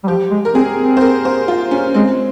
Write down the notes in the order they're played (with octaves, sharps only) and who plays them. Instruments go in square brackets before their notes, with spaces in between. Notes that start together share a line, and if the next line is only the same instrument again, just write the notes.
[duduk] G3
[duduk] F3 [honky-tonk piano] G4
[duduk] G#3
[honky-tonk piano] A#4
[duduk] C4 [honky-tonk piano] G#4
[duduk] C4
[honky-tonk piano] C5
A#4
C5
F4
C#4
[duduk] G#3 [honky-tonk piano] C4